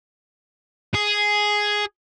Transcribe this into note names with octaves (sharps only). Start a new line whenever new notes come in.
G#4